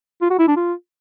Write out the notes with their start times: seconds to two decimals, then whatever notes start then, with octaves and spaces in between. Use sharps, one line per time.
0.22 F4
0.30 F#4
0.39 E4
0.48 D4
0.56 F4